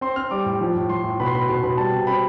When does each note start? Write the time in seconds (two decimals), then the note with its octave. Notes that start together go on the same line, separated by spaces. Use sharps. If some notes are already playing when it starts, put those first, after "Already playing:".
0.01 C4 C6
0.16 C4 F6
0.31 G3 D6
0.46 A2
0.61 F3
0.76 A2
0.89 F3 C6
1.04 A2
1.20 B2 B5
1.26 C6
1.34 B2 B5
1.48 B2 C6
1.63 B2 B5
1.77 G3 A5
1.93 C3
2.07 C4 B5